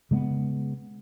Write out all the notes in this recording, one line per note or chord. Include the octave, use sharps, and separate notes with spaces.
C#3 G#3 A3 B3